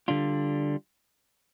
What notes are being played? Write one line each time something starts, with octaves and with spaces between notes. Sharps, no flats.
D3 G3 D4 F4